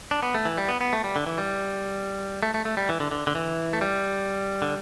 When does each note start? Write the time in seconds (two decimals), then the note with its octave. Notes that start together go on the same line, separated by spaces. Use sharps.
0.11 D4
0.23 B3
0.35 A3
0.45 E3
0.57 G3
0.68 B3
0.81 B3
0.93 A3
1.04 G3
1.16 D3
1.27 E3
1.38 G3
2.43 A3
2.54 A3
2.65 A3
2.77 G3
2.89 E3
3.00 D3
3.11 D3
3.27 D3
3.35 E3
3.73 A3
3.81 G3
4.62 D3